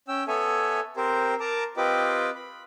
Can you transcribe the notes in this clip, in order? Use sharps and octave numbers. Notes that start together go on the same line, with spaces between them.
C#4 G5 E6
B3 A4 C#5 E5 G#5
C4 G4 A#4 C5
A#4 A5 A#5 D6
C4 F4 G4 B4 D#5 D6
B5